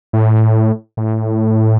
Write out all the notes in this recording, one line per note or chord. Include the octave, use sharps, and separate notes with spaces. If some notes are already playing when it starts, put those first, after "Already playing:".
A2
A2